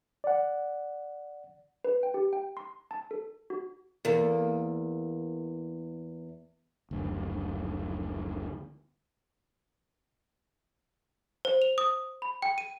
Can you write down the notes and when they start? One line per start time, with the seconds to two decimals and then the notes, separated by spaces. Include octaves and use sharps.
0.24 D5 F#5
1.84 B4
2.03 G5
2.14 G4
2.33 G5
2.57 C6
2.91 A5
3.11 A4
3.50 F#4
4.05 E2 A#3
6.91 F#1 D2
11.45 C5
11.62 F7
11.78 D#6
12.22 B5
12.42 G5
12.58 D#7